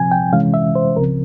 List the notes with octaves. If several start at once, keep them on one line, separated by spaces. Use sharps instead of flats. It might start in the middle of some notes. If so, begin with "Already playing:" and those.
Already playing: C3 F3 C4 G#5
G5
C3 E3 G#3 C#4 F5
E5
C5
C#2 C#3 F3 C4 A#4